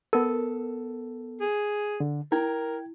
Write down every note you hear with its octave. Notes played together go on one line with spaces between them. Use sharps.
B3 A4 A#4
G#4
D3
E4 A#4 G5 G#6